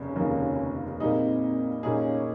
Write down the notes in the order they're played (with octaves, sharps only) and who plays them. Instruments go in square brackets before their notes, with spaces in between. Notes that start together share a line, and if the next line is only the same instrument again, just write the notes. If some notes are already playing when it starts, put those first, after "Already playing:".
Already playing: [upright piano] F1 D#2 C#3 [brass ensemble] C#4
[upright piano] F1 D#2 C#3 F3 A#3
[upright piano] A#2 G3 A#3 D#4 G#4 [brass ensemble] C4
[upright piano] A#2 G3 A#3 D#4 G#4 [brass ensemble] C#4